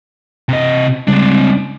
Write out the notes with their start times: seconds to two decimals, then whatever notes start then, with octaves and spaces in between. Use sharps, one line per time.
0.49 C3 D#5
1.08 C#3 G3 G#3 C4 D4